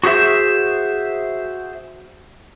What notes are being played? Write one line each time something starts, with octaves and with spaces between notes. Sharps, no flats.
F#4 G#4 C5 E5